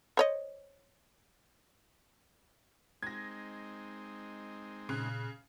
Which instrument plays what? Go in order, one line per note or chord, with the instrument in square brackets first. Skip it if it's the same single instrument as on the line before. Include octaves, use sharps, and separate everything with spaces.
[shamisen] C5 C#5 D#5
[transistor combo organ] G#3 C4 D#4 [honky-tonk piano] G#6 A#6
[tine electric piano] A#2 F#6 [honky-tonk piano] C#3